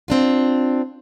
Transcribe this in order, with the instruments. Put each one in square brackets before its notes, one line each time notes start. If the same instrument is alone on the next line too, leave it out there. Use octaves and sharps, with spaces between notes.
[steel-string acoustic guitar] C4 D4 F4